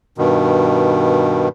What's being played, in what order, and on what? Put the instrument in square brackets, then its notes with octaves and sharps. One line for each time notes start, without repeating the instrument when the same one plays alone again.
[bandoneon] G2 B2 D#3